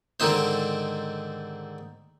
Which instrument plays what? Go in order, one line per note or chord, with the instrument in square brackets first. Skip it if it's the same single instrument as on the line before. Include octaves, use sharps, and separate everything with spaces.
[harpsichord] G#2 D3 D#3 C4 D#4 C5